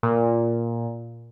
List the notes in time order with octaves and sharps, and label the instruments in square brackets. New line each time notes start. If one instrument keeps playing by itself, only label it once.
[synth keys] A#2